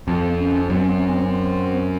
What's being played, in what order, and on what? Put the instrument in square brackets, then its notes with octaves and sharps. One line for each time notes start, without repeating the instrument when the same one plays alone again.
[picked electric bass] F2 [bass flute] C4
[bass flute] C#4
[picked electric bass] F#2 [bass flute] C4
[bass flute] C#4
C4
C#4
C4
C#4
C4